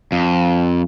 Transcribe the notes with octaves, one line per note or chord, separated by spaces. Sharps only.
F2